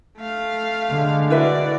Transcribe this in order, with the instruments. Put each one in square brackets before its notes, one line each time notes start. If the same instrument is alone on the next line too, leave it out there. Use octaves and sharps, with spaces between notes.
[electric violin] A3 F5
[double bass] D3 G#3
[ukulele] E4 B4 E5 [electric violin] F#4 D5